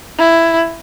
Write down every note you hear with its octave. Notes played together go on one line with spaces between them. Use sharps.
E4